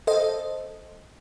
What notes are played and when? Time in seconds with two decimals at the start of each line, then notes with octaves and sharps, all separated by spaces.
0.07 A4 C5 D#5